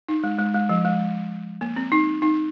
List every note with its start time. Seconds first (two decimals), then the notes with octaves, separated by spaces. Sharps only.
0.09 D#4
0.24 G#3
0.39 G#3
0.54 G#3
0.69 F3
0.85 G#3
1.61 A#3
1.76 C4
1.92 D#4
2.22 D#4